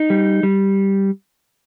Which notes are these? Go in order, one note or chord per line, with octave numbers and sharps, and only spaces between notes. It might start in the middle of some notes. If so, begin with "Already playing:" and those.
Already playing: D#4
G3
G3